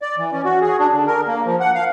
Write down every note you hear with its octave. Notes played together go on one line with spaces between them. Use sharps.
D5
E3
C#4
F#4
G#4
D4
D3
A#4
A#3
F3
F#5
F5